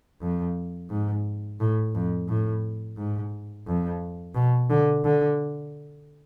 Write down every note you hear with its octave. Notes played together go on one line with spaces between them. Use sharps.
F2
G#2
A2
F2
A2
G#2
F2
B2
D3
D3